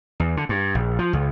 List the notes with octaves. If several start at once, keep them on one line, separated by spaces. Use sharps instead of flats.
E2
D3
G2
A#1
F3
C#2